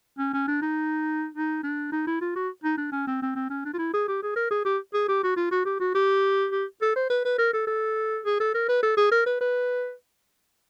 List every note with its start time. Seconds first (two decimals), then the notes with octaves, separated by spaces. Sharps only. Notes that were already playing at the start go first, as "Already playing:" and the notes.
0.19 C#4
0.33 C#4
0.48 D4
0.62 D#4
1.35 D#4
1.63 D4
1.92 D#4
2.07 E4
2.21 F4
2.36 F#4
2.64 D#4
2.78 D4
2.92 C#4
3.07 C4
3.22 C4
3.36 C4
3.50 C#4
3.65 D4
3.74 F4
3.78 E4
3.93 G#4
4.08 G4
4.23 G#4
4.36 A#4
4.51 G#4
4.65 G4
4.94 G#4
5.08 G4
5.24 F#4
5.37 F4
5.52 F#4
5.66 G4
5.80 F#4
5.95 G4
6.52 G4
6.82 A4
6.96 C5
7.10 B4
7.25 B4
7.38 A#4
7.54 A4
7.67 A4
8.26 G#4
8.40 A4
8.54 A#4
8.69 B4
8.83 A4
8.97 G#4
9.12 A#4
9.26 B4
9.41 B4